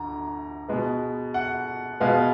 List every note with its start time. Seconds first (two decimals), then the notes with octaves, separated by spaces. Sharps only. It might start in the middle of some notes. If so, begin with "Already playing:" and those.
Already playing: D2 D3 A#5
0.68 B2 G#3 B3
1.34 F#5
2.00 B2 G#3 B3 F5